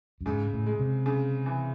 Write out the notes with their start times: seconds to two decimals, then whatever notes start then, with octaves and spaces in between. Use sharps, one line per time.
0.21 F#2
0.26 G#2 C#3
0.53 A2
0.66 G#3
0.79 C3
1.06 C#3
1.46 E3